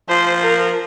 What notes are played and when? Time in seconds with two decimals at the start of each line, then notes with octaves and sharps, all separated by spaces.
0.09 F3 C5
0.43 A#4